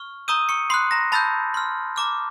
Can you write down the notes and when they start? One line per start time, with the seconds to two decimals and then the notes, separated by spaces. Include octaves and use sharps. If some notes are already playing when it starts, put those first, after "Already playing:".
Already playing: C#6 F6
0.28 A#5 C#6 D#6 E6 G6 D#7
0.49 C#6 C#7
0.70 B5 C6 D#6 F#6 C7
0.91 A#5 A#6
1.12 A5 B5 E6 G6 A6
1.54 C6 F6
1.96 A#5 D6 F6